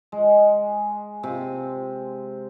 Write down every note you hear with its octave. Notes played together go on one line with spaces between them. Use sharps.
G#3
C3